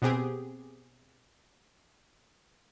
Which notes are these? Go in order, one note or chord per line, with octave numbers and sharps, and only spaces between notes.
B2 B3 C4 G4 G#4